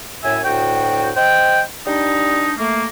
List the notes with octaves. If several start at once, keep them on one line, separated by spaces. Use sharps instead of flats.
F#2 A2 E5 G#5
D2 A2 F#4 G5
C5 D#5 G5
G3 D4 D#4
A3 A#3